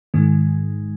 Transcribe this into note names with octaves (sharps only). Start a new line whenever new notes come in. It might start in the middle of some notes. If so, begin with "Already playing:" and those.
G#2 D#3 G#3